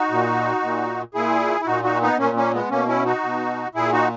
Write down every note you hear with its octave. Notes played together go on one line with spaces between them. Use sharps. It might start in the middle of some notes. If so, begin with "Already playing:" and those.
Already playing: D#4 F#4
A#2
A#2
A#2 E4 G#4
E4
A#2 D#4 F#4
D#4 F#4
B3 D#4
A#2 A#3 C#4
A#3 C#4
G#3 B3
B2 A#3 C#4
C#4 E4
D#4 F#4
B2
A#2 E4 G#4
D#4 F#4